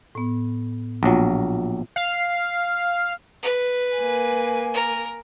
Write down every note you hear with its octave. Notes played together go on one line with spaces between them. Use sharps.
A2 B3
A#1 F#3 B3 F4
F5
B4
A#3 G#5
A#4